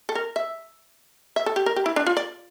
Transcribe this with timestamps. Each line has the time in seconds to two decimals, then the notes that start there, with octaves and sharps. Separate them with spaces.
0.09 A4
0.15 A#4
0.36 E5
1.36 E5
1.46 A4
1.56 G4
1.66 A#4
1.76 G4
1.86 E4
1.96 D4
2.07 F4
2.17 D5